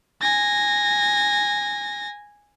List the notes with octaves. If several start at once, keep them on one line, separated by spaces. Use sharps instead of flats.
G#5 A#6